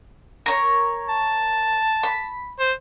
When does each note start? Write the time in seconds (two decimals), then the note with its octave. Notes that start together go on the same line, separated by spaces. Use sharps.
0.46 A#4 C#5
1.09 A5
2.03 B5
2.60 C5